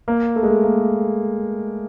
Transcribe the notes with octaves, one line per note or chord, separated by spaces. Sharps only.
A#3
A3
G#3
A3
A#3